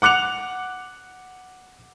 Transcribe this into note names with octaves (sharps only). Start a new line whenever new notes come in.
F#5 D6 F#6 C#7 F7